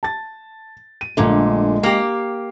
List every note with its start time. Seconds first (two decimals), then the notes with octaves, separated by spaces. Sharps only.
0.03 A5 A6
1.01 D#7
1.17 A#1 A#2 D3 G#3 A3
1.83 A#3 G4 C7